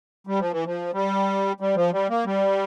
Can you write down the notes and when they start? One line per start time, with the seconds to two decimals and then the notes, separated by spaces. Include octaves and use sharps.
0.27 G3
0.39 F3
0.52 E3
0.65 F3
0.93 G3
1.60 G3
1.76 F3
1.93 G3
2.10 A#3
2.25 G3